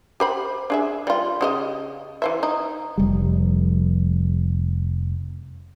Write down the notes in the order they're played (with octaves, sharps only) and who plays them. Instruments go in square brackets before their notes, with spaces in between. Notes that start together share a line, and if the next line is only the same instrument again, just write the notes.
[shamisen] G4 C5 B5
D4 G#4 E5
G3 F4
C#3 G4 D#5
E3 C5 E5
D#4
[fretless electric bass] F1 G3